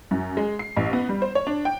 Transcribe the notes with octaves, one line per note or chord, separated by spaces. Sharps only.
F#2
G#3
C7
A1
B3
G3
C5
C#5
D4
G5